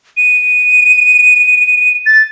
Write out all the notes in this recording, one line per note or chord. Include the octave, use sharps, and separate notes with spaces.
D#7
A6